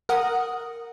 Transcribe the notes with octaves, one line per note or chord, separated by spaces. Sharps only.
A#4 F#5 D#6